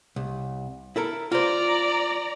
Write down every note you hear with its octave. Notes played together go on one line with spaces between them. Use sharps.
C2
E4 A4 A#4
F4 C5 D5 A#5